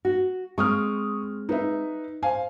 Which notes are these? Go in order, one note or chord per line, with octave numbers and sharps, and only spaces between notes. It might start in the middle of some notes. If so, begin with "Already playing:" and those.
F#4
G#3 C4 C#6 D#6 F6
D#4 B4 E5
C5 F5 G#5